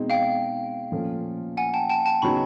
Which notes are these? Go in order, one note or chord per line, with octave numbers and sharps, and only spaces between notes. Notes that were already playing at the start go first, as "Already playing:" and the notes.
Already playing: B2 G#3 C4 D#4
F5 G5
A#2 F3 A3 C#4 F4
F#5 G#5
G5 A5
G5 A5
G5 A5
C#3 F#3 B3 D#4 B5 C#6